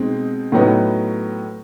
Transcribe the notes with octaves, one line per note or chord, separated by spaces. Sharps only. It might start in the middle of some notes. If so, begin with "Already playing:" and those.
Already playing: B2 G#3 C4 D#4
A2 F#3 B3 D#4